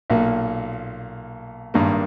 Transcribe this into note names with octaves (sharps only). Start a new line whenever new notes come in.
B1 A#2 A#3
G#1 G2 D#3 A#3